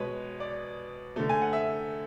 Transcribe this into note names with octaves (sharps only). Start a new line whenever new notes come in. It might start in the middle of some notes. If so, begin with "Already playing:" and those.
Already playing: B2 G#3 B4 C#5
D5
D3 A3
G#5
F#5
E5